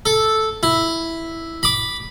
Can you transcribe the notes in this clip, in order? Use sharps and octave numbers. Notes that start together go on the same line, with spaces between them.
A4
E4
B5 D6